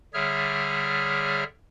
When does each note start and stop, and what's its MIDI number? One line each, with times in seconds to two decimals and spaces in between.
0.14 1.44 50
0.14 1.44 55
0.14 1.44 68
0.14 1.44 73
0.14 1.44 76
0.14 1.44 89